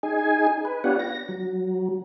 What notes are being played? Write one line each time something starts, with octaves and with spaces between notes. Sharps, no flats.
D#4 G#4 G#5
B4
B3 D4 F4 G4 C#5 F#5
A#6
F#3